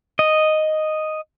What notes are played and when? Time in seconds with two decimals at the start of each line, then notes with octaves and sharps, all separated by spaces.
0.19 D#5